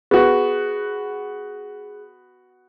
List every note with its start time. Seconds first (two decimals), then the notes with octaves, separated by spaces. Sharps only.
0.11 B3 F#4 G#4